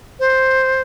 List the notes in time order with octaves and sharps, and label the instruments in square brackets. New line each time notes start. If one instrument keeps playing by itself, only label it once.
[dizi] C5